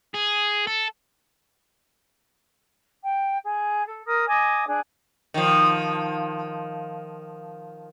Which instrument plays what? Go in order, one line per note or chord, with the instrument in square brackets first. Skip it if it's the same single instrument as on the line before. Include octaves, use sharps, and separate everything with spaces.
[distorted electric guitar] G#4
A4
[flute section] G5
G#4
A4
A#4 D#6
D#5 G#5 D6 D#6
D4 G#4
[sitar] D#3 F3